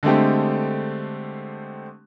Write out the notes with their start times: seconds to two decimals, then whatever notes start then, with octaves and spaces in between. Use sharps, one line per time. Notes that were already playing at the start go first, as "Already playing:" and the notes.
0.03 D3 G#3 A3 C4 G4